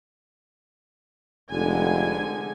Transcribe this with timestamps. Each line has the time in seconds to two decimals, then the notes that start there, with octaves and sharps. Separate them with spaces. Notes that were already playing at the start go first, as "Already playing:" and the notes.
1.52 F1 D3 G#3 G#5